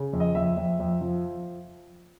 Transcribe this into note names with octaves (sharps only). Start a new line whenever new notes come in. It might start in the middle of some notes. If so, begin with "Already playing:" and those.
Already playing: C#3
F2
D#5
F2 E5
F2
F2
F3